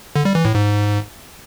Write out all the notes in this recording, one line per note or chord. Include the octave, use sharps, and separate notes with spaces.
D3
G3
E3
A2
G#2